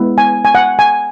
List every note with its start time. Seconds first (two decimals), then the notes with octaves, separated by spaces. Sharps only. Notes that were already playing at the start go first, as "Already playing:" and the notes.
Already playing: G#3 B3 E4
0.18 G#5
0.45 G#5
0.55 F#5
0.79 G#5